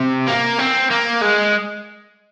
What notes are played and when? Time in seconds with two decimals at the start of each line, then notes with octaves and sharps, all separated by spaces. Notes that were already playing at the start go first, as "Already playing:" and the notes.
Already playing: C3
0.28 A#3
0.59 C4
0.90 A#3
1.21 G#3